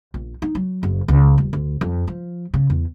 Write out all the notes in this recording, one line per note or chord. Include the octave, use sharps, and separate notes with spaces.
A#1
D#4
F#3
F#1
C#2
D#1
D2
F2
F3
C#3
E2